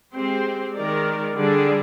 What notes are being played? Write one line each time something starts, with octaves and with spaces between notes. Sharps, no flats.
G#3 C4 G4 C5
D#3 G#3 D#4 A#4 D5
D3 G3 D4 G#4 D5